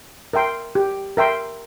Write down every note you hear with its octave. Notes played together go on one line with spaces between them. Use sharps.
A#4 E5 G5 C6
G4
A#4 E5 G5 C6